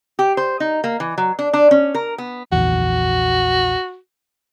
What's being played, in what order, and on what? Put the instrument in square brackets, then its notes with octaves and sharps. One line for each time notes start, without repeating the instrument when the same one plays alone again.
[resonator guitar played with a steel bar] G4
C5
D#4
A#3
E3
F#3
D4
D4
C#4
A#4
B3
[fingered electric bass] A#1 E2 [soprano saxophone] F#4